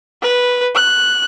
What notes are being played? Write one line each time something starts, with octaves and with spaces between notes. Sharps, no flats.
B4
F#6